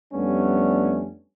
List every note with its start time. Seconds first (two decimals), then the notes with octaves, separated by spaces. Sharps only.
0.14 F2 G3 A3 B3 C#4 D4